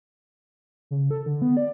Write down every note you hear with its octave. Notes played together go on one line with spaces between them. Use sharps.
C#3
A4
D3
B3
D5